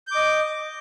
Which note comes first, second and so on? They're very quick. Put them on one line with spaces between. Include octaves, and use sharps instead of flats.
G6 D6 D#5